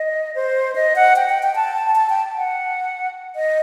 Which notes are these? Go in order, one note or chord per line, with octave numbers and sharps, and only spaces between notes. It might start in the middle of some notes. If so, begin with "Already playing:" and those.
Already playing: D#5
C5
D#5
F#5
G5
G5
G5
A5
A5
G5
F#5
D#5